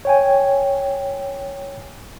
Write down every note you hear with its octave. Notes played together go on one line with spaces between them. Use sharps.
C#5 G5 G#5